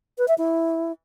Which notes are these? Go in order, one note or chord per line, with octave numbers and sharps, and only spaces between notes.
B4
E5
E4